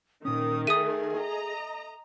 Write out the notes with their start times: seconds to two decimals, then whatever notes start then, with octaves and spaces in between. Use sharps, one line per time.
0.25 A#2 D#3 C#4 D#6
0.67 G#4 A4 E5 D#6 D#7
1.18 D#5 A#5